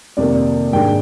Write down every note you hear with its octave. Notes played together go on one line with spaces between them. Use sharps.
F2 C3 D#3 A#3 D5
G#2 D#3 G#3 D4 G5